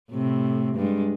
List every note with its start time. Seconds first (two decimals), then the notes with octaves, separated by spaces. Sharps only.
0.11 A2 C3
0.76 G2 G#3